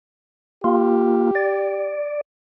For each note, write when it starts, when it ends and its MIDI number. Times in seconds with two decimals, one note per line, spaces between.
0.64 1.31 58
0.64 1.31 65
0.64 1.99 67
1.35 2.21 74